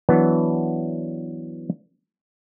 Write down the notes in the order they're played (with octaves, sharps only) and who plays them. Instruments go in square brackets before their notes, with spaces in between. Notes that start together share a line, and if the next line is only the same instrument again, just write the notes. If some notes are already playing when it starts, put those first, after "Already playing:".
[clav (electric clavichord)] E3 F#3 B3 D4